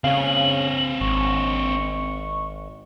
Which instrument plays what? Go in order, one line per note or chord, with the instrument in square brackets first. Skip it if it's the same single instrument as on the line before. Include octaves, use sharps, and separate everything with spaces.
[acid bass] C#3 [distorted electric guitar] C4 C#5 [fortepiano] F5 [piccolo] F#7
[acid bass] G#1 [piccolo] C#6